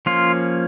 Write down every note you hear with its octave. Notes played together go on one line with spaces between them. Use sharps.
F3 A#3 C#4 F4